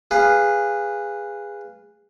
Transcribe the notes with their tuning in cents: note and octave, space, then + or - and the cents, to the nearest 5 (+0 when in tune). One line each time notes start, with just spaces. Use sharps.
G#4 -20 B4 +0 F5 +0